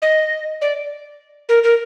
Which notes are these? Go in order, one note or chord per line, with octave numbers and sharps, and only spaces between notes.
D#5
D5
A#4
A#4